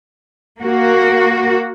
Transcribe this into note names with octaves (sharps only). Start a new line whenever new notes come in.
A#3 F#4